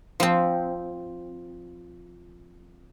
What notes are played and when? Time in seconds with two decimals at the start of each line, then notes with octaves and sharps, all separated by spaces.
0.20 F3 C4